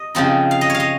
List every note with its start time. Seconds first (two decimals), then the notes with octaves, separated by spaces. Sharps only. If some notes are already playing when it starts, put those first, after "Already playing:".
Already playing: D#5
0.15 C#3 F3 C4 D#4
0.51 F5
0.61 D#5
0.70 C#5 F5
0.80 D#5